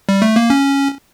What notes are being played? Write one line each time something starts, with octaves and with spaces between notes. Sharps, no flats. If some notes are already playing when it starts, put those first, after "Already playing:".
G3
A3
A#3
C#4